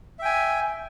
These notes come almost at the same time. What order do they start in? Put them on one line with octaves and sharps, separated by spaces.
E5 G5 G#5